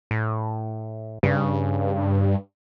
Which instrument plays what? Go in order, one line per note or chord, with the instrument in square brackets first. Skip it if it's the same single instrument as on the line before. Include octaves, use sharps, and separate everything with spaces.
[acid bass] A2
[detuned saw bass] G2 [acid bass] C#3